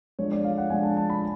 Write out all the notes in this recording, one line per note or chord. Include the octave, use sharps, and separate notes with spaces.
F3 G#3 D4 C#5
D5
F5
F#5
F3 G#3 D4 G#5
A5
A5
B5